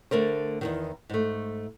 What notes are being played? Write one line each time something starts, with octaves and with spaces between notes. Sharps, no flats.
D3 A3 A#4 C5
E2 G#2 D#3
G#2 A3